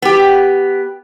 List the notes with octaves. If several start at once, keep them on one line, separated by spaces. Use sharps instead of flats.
B3 G4